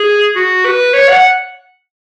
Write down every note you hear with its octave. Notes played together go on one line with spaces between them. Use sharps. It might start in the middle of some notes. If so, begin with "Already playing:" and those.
Already playing: G#4
F#4
B4
C#5
F#5